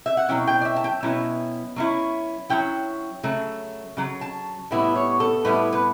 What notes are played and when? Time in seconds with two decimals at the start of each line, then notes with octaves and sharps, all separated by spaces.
0.06 E5
0.17 F#5
0.29 B2 F#3 C#4 E4 G5
0.47 G5
0.61 D5
0.65 E5
0.76 A5
0.84 G5
1.03 B2 F#3 C#4 E4
1.76 F#3 C#4 E4
2.50 F#3 C#4 E4 G5
3.23 C#3 F#3 A3
3.97 C#3 F#3
4.21 A5
4.71 A2 G3 B3 E4
4.95 C#5
5.20 A4
5.45 A2 G3 B3 E4 B4
5.73 B4